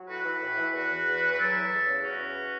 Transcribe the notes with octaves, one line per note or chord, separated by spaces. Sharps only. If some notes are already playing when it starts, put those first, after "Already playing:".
Already playing: F#3
A2 F#4 B4
E3
A2
E3
E2 F#4 B4
E3
E2
E3
B4
F#3 E4 A4
E2
E2
C#3
E2 C#4 F#4
E3